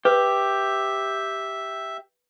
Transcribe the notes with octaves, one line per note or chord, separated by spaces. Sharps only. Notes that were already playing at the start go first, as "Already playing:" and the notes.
G4 B4 E5